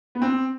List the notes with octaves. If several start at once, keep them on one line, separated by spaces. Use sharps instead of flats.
B3
C4